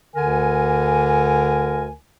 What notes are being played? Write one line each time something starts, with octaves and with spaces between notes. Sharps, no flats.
D2 D3 A#4 G#5